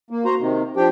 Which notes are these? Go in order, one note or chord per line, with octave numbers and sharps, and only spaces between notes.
A#3
F#4 C5 A#5
C3 D#3
F3 D4 G4 G5